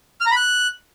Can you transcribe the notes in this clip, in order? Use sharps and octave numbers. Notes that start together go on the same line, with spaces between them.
F6
A#5
B5
F#6